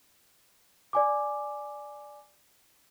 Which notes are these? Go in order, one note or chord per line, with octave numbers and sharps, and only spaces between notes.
D5 G#5 D6